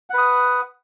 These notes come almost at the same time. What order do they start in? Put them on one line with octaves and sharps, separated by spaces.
F#5 B4 D#6